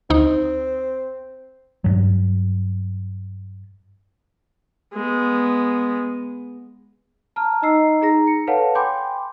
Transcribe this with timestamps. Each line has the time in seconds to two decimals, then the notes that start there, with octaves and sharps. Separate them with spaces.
0.10 D2 C4 D#4
1.84 G2 F#3
4.94 G#3 B3
7.36 A5 A#5 F6
7.62 D#4 D#5 A#5 E6 C7
8.01 D#4 G#4 A#5 A#6
8.27 C#7
8.47 A4 B4 C#5 F5 F#5 A5
8.75 G5 G#5 B5 C6 D6 G6